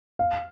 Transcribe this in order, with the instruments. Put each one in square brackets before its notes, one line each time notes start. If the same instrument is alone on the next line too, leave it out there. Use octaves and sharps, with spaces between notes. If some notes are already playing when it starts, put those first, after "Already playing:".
[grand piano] F5